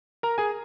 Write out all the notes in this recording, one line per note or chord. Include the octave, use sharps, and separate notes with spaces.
A#4 A#5
G#4 G#5